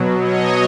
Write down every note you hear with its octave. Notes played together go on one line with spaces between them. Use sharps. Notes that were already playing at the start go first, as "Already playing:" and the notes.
Already playing: B2 F#3
C#5 D#5